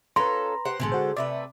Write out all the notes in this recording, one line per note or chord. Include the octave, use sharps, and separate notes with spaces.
C#4 F4 A4 B4 A#5 C6
G4 C5 F#5
A1 B2 D3 G#3 A4
F#4 C5
C3 A3 B4 D5